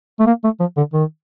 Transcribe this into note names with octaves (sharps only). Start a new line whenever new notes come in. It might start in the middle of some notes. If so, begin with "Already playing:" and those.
A3
A#3
A3
F3
D3
D#3